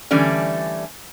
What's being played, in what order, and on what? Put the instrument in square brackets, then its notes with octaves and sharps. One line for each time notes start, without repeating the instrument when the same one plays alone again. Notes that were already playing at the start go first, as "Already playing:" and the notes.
[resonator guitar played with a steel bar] D3 E3 G3 A3 C#4 D5